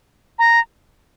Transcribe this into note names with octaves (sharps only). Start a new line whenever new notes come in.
A#5